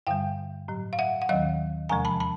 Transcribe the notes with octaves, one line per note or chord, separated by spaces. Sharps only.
G2 D3 G3 F5 G5
A2 F#3
F5
E5 F#5
F#5
D#2 D#3 F#3 D#5 F5
E2 C3 F3 G#3 G#5 A#5
A5 B5
A5 B5